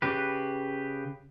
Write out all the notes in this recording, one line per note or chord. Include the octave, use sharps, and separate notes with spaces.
C#3 G4 B4